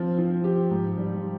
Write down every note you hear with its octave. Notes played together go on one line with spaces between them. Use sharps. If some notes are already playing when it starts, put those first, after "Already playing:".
Already playing: F3 C4
F3
G4
G#2
G3